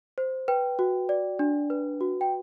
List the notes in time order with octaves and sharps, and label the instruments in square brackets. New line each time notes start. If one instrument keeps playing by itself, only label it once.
[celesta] C5
B4 G5
F#4
D5
D4
B4
F#4
G5